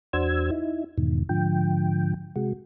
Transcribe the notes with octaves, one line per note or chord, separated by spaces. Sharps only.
E2 D4 F#4 C5 E6 G#6
D#4 E4
E2 G#2 B2 D#3
G#2 D3 F3 G5
C3 G#3 F#4